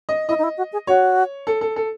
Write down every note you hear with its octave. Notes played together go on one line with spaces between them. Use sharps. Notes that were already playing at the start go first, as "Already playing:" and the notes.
D#5
E4 D#5
D#4
E4
F#4
G#4
F#4 C#5
A4
A4
A4